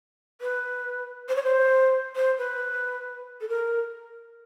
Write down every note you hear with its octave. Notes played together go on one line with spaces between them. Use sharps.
B4
C5
C#5
C5
C5
B4
A4
A#4